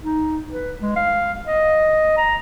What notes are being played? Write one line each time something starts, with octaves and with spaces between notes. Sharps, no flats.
D#4
B4
G#3
F5
D#5
A#5